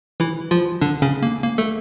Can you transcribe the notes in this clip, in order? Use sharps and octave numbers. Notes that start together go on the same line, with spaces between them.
E3 E4
F3 F4
D3 D4
C#3 C#4
A#3
A#3
A3 A4